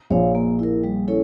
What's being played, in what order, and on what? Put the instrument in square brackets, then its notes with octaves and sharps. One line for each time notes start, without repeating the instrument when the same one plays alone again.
[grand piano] A#1 A#2 [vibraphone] C#5 F5
[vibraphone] A#3
E4 A#4
G3
C#4 E4 A4 C#5